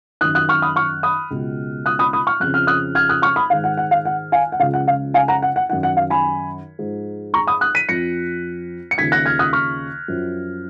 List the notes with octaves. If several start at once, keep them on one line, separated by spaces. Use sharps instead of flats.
F#2 D#3 D#6 F#6
D#6 F#6
C#6 F6
B5 D#6
C#6 F6
B5 D#6
C#2 B2
D#6 F#6
B5 D#6
B5 D#6
C#6 F6
F2 C#3 F3 F#6
F6
D#6 F#6
F6 G#6
D#6 F#6
C#6 F6
B5 D#6
G#2 D#3 F5
F#5
F#5
F5
F#5
F5 G#5
F#5
C#2 C#3 F3 F5
F#5
F5
F5 G#5
F#5 A#5
F#5
F#5
F#2 D#3 F#5
F#5
F5
G#5 B5
G#2 F3
A#5 C#6
B5 D#6
D#6 F#6
B6 D#7
F2 F3 A#6 C#7
C#7
D#2 C#3 F3 G#6 B6
F#6 A#6
F6 G#6
D#6 F#6
C#6 F6
F#2 F3